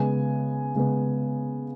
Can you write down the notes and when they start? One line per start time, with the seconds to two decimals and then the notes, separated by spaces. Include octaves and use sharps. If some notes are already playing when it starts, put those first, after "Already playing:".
Already playing: C#3 G#3 B3 G#5
0.75 C#3 G#3 B3